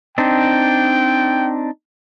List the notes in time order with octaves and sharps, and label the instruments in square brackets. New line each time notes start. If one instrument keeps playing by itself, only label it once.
[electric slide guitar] C4 D4 D#4 [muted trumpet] G5